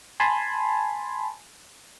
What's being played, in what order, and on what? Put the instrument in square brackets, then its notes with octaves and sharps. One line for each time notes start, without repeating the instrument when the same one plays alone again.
[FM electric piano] G#5 A5 B5 C6